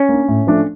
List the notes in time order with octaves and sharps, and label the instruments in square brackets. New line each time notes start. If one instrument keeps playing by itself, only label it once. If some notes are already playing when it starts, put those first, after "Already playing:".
Already playing: [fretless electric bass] C#4
[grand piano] A#3 D4
A2
F3 A3 D4